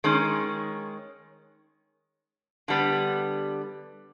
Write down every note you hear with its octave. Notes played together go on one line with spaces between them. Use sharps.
D#3 G#3 C#4
D3 G3 B3